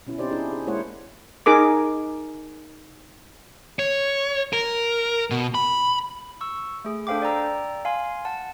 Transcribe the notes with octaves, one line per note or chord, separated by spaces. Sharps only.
B2 C#4 E4
C4 D#4 G4 C5 D5
D4 E4 G#4
G#4
G#3 A#3 E4 C5 C#5 F#5
D#4 G#4 A#4 D6
C#5
A#4
B2
B5
C#6 E6
A3 G#4
D4 A4 C5 F5 G5 D6
D5 G5 A#5 E6
F5 G#5 C6
F#5 A5